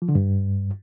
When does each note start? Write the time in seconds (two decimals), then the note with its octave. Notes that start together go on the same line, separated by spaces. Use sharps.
0.02 F3
0.09 D3
0.15 G2